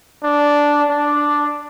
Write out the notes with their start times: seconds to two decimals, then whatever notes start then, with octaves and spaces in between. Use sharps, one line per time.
0.24 D4
0.90 D4